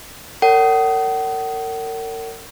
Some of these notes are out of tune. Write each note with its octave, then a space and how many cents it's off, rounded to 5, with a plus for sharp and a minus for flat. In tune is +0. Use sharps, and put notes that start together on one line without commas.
A#4 -40 C#5 +35 F#5 +40